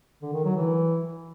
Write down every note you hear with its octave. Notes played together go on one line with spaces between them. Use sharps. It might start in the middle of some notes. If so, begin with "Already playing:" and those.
D3
D#3
F#3
E3